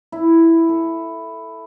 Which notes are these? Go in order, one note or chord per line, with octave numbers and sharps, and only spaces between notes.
E4
A4